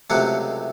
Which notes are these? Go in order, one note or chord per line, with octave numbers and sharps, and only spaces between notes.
C#2 C3 F#3 A3 F#5